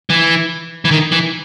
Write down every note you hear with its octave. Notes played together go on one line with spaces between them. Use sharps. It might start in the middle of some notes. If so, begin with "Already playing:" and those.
E3
E3
D#3
E3